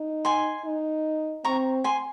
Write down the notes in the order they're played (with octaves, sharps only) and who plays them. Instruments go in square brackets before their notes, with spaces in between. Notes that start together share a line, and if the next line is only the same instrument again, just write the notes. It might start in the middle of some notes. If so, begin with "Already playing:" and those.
Already playing: [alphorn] D#4
[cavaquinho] G#5 C6
[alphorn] D#4
[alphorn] C4 [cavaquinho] A#5 C#6
[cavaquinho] G#5 C6